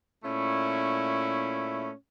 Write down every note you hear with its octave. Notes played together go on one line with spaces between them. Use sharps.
A#2 A3 C#4 E4